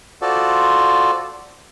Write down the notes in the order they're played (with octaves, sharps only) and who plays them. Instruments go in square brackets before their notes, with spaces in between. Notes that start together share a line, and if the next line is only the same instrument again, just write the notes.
[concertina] F4 F#4 A4 C5 D5